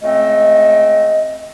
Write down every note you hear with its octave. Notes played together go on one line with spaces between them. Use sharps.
C#2 A3 C4 D#5